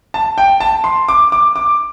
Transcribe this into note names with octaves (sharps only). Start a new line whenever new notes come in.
A5
G5
A5
C6
D6
D6
D6